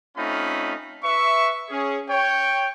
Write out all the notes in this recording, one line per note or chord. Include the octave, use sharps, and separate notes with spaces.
A3 C4 C#4 D#4 F4 B5
B4 E5 C#6
C#4 G#4
C#5 G5